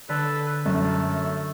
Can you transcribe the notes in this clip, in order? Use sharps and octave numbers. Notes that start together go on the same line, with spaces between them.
D3 A4 B4
F#2 A3 A4